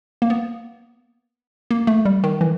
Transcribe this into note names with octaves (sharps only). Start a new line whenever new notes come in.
A#3
B3
A#3
A3
G3
D#3
E3